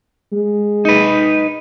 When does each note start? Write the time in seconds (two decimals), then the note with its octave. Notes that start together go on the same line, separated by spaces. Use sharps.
0.32 G#3
0.85 D#4 B4